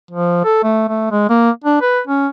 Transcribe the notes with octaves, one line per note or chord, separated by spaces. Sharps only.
F3
A4
A3
A3
G#3
A#3
D4
B4
C#4